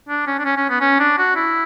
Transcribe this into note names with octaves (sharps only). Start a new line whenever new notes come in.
D4
C#4
D4
C#4
C#4
B3
C#4
D4
F#4
E4